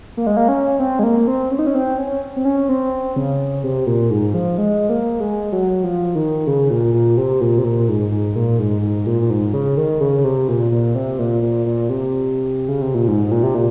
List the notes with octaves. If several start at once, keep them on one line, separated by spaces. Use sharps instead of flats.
A#3
G#3
A#3
C#4
C4
G#3
A#3
C4
C#4
D#4
C#4
C4
C#4
C4
C#4
C4
C#3
C3
A#2
G#2
F3
G#3
A#3
G#3
F#3
F3
D#3
C#3
A#2
A#2
C3
A#2
C3
A#2
G#2
G#2
A#2
G#2
G#2
A#2
A#2
G#2
C#3
D#3
C#3
C#3
C3
A#2
A#2
C3
A#2
A#2
A#2
C3
C#3
C3
A#2
G#2
G#2
A#2
C3
A#2